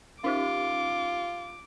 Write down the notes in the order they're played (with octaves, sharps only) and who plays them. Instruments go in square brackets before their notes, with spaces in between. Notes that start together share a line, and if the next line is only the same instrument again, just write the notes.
[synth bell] C#4 D#4 G4 [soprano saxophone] F4 [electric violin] D6